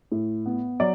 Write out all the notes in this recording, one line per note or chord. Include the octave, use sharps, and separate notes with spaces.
A2
B3
F#3 D5